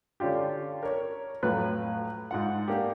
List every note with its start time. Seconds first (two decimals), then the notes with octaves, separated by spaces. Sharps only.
0.20 D3 C#4 D4 F4 G4
0.83 A#4 C#5
1.43 F2 A2 F#3 B4 F#6
2.31 G#2 F4 F#5
2.68 A#3 D4 G4